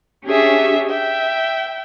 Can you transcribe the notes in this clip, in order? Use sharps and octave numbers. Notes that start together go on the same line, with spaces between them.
C#4 D4 G4 G#4 C#5 E5
E5 G5